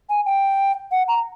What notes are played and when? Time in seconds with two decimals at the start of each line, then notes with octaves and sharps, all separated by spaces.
0.09 G#5
0.26 G5
0.91 F#5
1.08 A#5